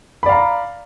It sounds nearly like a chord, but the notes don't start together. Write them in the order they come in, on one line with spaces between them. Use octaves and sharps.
B5 D5 F5 A#5